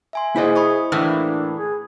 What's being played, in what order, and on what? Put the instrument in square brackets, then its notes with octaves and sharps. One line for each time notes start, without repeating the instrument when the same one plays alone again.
[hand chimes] E5 G#5 C6
[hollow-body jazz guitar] E4 C5 D#5 [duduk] G#4
[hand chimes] B5 C#6 D#6
[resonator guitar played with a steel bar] A2 E3 A#3 [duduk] D4
[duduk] G#4